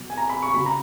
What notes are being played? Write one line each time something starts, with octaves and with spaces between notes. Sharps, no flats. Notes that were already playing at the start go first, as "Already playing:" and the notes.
Already playing: B2 F#3
G#5
A#5
B5
C#6
C#3 F#3 B5
A#5